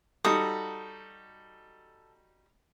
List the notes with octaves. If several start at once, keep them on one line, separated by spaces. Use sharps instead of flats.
G3 D#4 F#4 A4 D#6